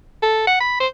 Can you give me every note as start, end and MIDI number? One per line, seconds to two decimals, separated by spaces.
0.22 0.43 69
0.47 0.57 78
0.60 0.77 83
0.80 0.87 72